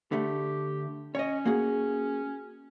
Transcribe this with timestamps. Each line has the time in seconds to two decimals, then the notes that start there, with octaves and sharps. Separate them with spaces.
0.12 D3 A3 G4
1.15 C#4 C#5 D#5
1.45 A#3 F#4 G#4